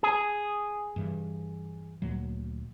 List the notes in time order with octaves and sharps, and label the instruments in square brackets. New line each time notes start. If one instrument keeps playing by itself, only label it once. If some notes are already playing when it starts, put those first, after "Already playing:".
[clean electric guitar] G#4
[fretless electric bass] G2 E3
D2 A#2 F#3